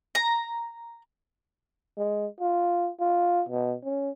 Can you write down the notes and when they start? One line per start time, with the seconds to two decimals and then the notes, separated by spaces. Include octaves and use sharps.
0.15 A#5
1.97 G#3
2.41 F4
3.00 F4
3.49 B2
3.84 C#4